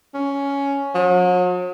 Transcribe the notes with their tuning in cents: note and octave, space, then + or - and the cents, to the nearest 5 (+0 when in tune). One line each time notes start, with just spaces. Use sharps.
C#4 +10
F#3 -45